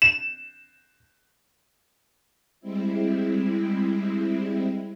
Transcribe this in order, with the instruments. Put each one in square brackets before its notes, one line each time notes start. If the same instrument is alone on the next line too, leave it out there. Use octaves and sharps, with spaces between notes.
[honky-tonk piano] E7
[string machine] G3 G#3 C4 E4